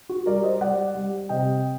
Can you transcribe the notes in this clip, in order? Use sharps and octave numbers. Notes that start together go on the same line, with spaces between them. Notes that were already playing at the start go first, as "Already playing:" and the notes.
F#4
G3 A#4 D5
C5 D#5
G3 D5 F#5
G3
C3 D#5 G5